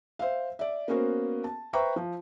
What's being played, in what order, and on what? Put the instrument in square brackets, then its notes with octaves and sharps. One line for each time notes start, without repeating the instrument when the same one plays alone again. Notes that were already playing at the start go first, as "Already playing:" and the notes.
[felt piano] C5 E5 F5
D5 E5
A#3 B3 C#4 F#4 A#4 C5
A5
B4 C5 E5 G5 A#5 C#6
F3